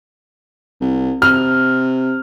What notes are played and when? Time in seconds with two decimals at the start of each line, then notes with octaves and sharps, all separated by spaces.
0.81 C2
1.22 C3 F6